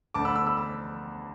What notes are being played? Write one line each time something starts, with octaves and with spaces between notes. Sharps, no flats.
D2 D3 A5 D6
B5 E6
B5 E6
B5 E6
B5 E6